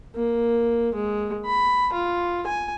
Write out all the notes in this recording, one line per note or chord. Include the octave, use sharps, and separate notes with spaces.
A#3
G#3
B5
F4
G#5